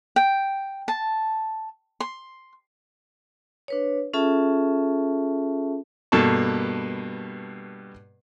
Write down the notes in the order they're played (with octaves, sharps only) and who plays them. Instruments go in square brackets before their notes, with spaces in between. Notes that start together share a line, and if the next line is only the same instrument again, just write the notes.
[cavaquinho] G5
A5
C6
[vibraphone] D4 B4 C#5
C#4 F4 G#4 A4 E5 A5
[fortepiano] G2 B2 A#3 A4 A5 C#6